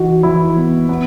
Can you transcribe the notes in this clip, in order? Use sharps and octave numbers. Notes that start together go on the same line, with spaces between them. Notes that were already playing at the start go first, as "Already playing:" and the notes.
Already playing: E3 D#4 F#4
E3 E4
B3
B3